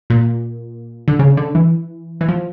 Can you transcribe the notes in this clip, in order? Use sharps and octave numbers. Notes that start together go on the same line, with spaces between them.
A#2
D3
C#3
D3
E3
E3
F3